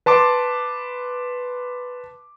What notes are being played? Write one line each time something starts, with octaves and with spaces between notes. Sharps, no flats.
B4 A5 C6 D6